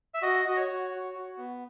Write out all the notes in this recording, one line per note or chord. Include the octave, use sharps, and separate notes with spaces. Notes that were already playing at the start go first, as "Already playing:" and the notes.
E5
F#4 D#5
F#4 D#5
C#5
F#4
F#4
F#4
B3